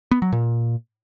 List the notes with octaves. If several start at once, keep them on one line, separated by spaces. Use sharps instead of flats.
B3
F#3
A#2